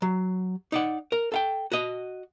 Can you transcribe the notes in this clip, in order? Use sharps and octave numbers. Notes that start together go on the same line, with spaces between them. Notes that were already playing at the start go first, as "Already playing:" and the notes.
F#3
D#4 D5 F#5
A#4
A4 F5 G5
F#4 D#5